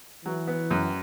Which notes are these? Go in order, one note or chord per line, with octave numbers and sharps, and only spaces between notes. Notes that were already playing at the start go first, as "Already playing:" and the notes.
E3 F#3
B3
F#2